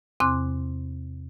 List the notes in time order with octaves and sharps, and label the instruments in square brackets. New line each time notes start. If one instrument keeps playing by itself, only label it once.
[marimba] E2 C3 C4 C6 D6 F#6